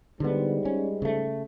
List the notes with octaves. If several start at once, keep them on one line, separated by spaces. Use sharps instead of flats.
G#2 D3 G3 B3
C#4
C#3 A3